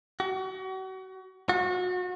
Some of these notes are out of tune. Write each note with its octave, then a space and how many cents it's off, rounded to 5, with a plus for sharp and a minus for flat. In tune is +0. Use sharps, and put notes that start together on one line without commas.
F#4 +35
F#4 -30